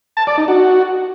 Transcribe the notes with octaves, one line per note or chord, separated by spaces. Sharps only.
A5
D5
D#4
F#4